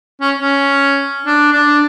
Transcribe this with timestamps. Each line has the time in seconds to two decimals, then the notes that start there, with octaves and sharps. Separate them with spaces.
0.21 C#4
0.39 C#4
1.26 D4
1.52 D4